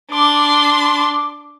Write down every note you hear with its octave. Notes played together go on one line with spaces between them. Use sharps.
D4 C6 D6